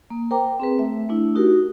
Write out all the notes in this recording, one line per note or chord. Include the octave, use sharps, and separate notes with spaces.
A#3
A#4 C5 G5 A#5 D6
C4 G#4 B4
A3 E5
A3 D4 E4
D#4 F#4 G4 A#4